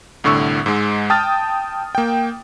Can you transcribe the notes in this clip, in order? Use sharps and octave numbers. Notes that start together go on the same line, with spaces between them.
C2 A2 D3 C#6 E6
G#2 G#3
G5 A5 D#6 F6 A6
A#3 G5